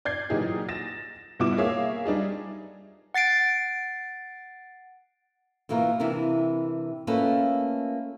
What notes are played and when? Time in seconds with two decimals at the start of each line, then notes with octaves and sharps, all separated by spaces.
0.05 D5 G6 G#6 C7
0.30 A#2 E3 F#3 D#4 G4 G#4
0.69 A6 A#6 E7
1.40 G2 B2 B3 E4 D6 E7
1.58 A#3 G#4 C#5 E5 F5
2.05 G3 D4 D#4 G#4
3.14 F#5 A6 C7 D7
5.69 B2 E3 A#3 F4 A#4
6.00 C3 E3 D4 E4 A#4
7.07 A3 A#3 C#4 F4 A4 B4